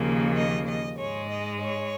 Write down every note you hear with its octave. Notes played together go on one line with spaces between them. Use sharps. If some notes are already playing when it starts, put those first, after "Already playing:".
Already playing: D#2 C#3 F3 A#3
D#5
D#5
G#2 G#3 C#5
D#5
C#5